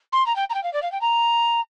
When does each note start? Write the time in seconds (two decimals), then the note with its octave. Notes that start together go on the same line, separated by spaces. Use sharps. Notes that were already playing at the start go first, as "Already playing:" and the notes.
0.13 C6
0.26 A#5
0.36 G5
0.50 A#5
0.54 G5
0.63 F5
0.73 D5
0.82 F5
0.92 G5
1.01 A#5